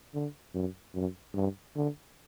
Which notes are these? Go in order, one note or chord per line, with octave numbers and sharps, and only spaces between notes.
D3
F#2
F#2
G2
D3